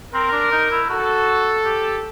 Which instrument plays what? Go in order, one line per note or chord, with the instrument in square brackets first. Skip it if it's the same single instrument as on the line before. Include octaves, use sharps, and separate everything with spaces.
[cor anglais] C4 [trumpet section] A#4
[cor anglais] D4
D#4
E4
[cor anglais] F#4 [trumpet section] A4
[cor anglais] G4